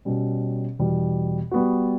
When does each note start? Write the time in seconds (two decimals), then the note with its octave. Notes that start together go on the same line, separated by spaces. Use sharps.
0.05 B2 G3 C#4
0.79 E2 B2 G3
1.51 G3 B3 F#4